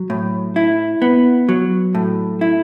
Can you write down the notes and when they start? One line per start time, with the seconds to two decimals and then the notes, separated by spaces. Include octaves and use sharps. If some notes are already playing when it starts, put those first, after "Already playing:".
Already playing: F#3
0.10 A2
0.56 E4
1.02 B3
1.49 F#3
1.95 A2
2.41 E4